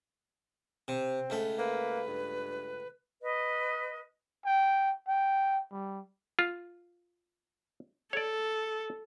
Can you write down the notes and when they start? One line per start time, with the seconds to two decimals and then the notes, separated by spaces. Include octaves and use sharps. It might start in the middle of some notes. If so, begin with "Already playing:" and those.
0.88 C3 C4
1.30 C#2 A3
1.58 A#3 B4
2.08 G2
3.22 B4 D#5
4.46 G5
5.08 G5
5.72 G3
6.39 F4
8.13 A4 C#5 D5